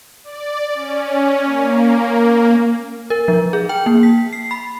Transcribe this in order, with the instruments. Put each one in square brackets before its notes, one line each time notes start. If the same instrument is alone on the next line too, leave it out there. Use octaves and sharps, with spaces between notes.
[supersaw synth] D5
C#4
A#3
[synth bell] A#4
F3
G#4
G5
A#3
B6
C7
B5